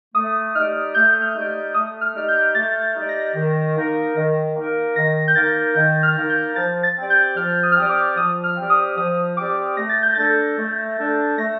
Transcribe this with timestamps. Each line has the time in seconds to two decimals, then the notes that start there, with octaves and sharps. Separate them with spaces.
0.15 A3 D#6
0.54 D#4 G4 D5 F6
0.94 A3 G6
1.22 F6
1.34 D#4 G4 D5
1.74 A3 D#6
2.01 F6
2.14 D#4 G4 D5 F6
2.28 G6
2.55 A3 A6
2.82 A6
2.95 D#4 G4 D5
3.09 A#6
3.35 D#3
3.76 A#3 D#4 A#4
4.16 D#3
4.55 A#3 D#4 A#4
4.96 D#3 A#6
5.28 G6
5.35 A#3 D#4 A#4 A6
5.76 D#3 G6
6.03 F6
6.16 A#3 D#4 A#4
6.30 G6
6.56 F3 A6
6.83 A6
6.96 C4 G4 D5
7.10 G6
7.36 F3 F6
7.63 D#6
7.72 F6
7.77 C4 G4 D5 D#6
7.89 D6
8.16 F3 D#6
8.44 F6
8.57 C4 G4 D5
8.70 D#6
8.97 F3 D#6
9.36 C4 G4 D5 D6
9.77 A3 A#6
9.89 A6
10.02 G6
10.15 D4 A4 A6
10.57 A3
10.98 D4 A4
11.38 A3 A#6